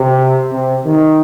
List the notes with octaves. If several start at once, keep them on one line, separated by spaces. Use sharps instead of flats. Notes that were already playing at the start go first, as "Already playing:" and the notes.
Already playing: C3
C3
D#3